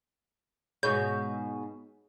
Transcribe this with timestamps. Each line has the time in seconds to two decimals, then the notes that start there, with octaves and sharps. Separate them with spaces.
0.83 G#2 B2 G#4 C#5 B5 G6